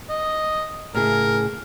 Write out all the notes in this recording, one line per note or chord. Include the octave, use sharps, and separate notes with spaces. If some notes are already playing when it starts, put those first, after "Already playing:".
D#5
A2 C#3 G#4 A#4